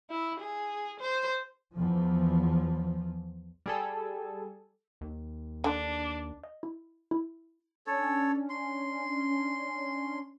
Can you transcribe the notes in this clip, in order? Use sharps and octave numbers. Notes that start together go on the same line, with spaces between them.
E4
G#4
C5
E2 F3
G3 G#4 A4
D#2
D3 D4
D#5
E4
E4
C#4 D4 A4 C#5
C6